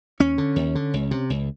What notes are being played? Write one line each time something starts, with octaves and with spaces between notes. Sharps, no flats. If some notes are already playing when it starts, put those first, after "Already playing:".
D#2 C#4
D3
D#2
D3
C#2
C3
C#2